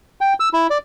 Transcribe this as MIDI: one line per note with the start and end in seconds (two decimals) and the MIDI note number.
0.21 0.33 79
0.40 0.49 88
0.53 0.67 64
0.70 0.78 74